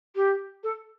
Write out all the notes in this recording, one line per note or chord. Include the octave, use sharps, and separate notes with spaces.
G4
A4